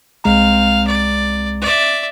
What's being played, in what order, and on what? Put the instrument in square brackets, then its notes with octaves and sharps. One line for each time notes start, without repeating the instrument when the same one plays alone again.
[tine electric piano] C2 G#3 A#5 [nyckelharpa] C4 F5
[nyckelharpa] D5
D5 E5